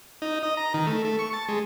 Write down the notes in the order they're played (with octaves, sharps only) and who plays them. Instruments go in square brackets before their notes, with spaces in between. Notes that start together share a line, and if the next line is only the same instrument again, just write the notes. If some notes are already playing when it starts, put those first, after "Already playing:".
[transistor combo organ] D#4
D#5
A#5
D#3
A3
A3
C#6
A5
G#3